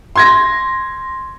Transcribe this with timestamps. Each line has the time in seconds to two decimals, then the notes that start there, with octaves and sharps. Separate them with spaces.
0.16 C6 G#6 A#6